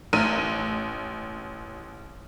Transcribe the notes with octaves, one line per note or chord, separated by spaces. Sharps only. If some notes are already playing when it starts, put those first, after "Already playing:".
A1 D#7